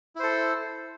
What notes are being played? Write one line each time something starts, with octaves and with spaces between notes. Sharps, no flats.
E4 A4 C5